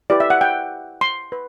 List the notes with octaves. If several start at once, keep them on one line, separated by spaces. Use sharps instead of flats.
E4 G4 B4 D5
E5
F#5
G5
C6
B4